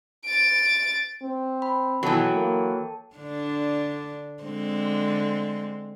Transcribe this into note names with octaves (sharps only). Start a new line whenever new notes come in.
A6 D7
C4
B5
B2 E3 F#3 A4 G5 A5
A#3
D3 D4
D3 G#3 C4